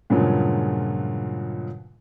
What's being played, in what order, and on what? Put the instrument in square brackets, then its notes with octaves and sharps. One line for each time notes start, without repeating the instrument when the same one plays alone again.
[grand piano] G2 A#2 C#3 F3 F#3 G#3